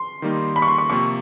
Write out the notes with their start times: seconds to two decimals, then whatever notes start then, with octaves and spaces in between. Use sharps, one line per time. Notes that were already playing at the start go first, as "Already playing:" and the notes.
Already playing: C6
0.22 D#3 G3 A#3 D#4
0.56 B5
0.62 C#6
0.67 C6
0.78 C#6
0.90 C3 F3 A#3 C#6